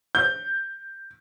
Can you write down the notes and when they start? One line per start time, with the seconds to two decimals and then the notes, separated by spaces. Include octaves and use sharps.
0.15 G6